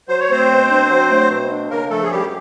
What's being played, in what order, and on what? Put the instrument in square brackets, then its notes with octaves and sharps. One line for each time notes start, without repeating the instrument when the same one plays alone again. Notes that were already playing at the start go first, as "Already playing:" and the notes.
[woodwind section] F#3 [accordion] C5
[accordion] C#5
[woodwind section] A3 [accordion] C4 C5
[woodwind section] B2
D4
F#3
A3
B2
D4
[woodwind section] C#3 [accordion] A#3 A#4
[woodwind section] F3 [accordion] A3 A4
[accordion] G#4
[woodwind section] F#2 [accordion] G3 G4